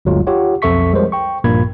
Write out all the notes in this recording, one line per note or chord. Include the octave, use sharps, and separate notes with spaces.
G1 D2 F#3 G#3 F4
F4 G4 C#5 F#5
B1 F2 A4 E5 C#6 B6
F3 G3 G#3 A#4 C5 C#5
G5 C#6
A#1 G2 A#2 A#3 B5 G#6